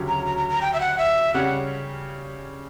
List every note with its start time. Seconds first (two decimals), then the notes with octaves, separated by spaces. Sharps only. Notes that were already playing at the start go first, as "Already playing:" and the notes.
Already playing: D2 C#3 F#3 C#4 G4
0.08 A#5
0.26 A#5
0.38 A#5
0.50 A#5
0.62 G5
0.74 E5
0.80 F#5
0.98 E5
1.34 C#3 G3 C#4 G4 F#5